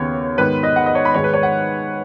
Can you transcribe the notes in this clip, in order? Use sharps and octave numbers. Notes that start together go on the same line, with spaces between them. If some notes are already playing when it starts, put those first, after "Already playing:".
Already playing: D#2 C#3 B3 C#5
G#2 D#3 B3 B4
D#5
F#5
D#5
C#5
B5
G#2 D#3 G#3 C#5
B4
C#5
F#5